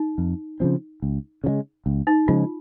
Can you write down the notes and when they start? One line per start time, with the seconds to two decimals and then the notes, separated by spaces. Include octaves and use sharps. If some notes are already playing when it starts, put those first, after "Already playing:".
Already playing: D#4
0.18 F2
0.60 C#3 F3 C4
1.02 C#2
1.44 C#3 F3 G#3
1.86 C#2
2.07 D#4
2.28 C#3 F3 G#3 F4